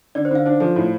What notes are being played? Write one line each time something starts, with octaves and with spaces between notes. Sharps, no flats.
D3 D5
C5
D3 F5
D4 C5
F3 A4
A2